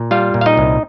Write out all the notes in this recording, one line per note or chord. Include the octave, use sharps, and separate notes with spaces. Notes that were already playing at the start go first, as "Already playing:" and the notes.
Already playing: A#2
G3 F4 F5
A#2
F5
D#4 D#5
C2